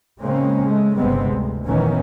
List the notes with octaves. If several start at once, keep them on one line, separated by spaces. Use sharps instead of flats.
C#3 G#3 A#3 C4 C#4
G#3 A3
G1 C3 G3 G#3 B3 C4
D2
F1 A#2 D#3 E3 B3 C#4